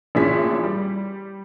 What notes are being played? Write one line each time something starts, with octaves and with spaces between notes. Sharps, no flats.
A1 A#2 D4 E4 G#4 B6
G3